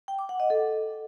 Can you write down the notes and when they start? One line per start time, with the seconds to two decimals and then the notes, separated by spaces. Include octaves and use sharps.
0.08 G5
0.19 D6
0.29 F#5
0.40 D#5
0.50 A4